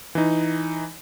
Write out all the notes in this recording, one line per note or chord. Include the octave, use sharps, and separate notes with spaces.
E3 D#4